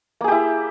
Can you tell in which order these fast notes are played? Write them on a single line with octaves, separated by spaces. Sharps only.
A#3 G#4 G4 E4